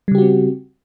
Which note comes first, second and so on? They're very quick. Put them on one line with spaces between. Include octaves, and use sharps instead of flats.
G3 C#3 G4 F#4 C4